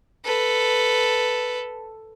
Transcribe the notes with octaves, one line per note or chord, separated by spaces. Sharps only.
A4 B4